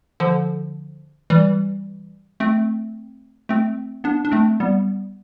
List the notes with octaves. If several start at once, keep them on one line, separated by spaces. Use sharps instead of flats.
D3 F3
E3 G3
A3 C4
A3 C4
B3 D4
D4
A3 C4
G3 B3